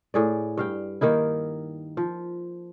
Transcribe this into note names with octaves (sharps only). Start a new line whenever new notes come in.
A2 G#4 D5
G2 F5 G5
D#3 A#3 D#4 E4
F3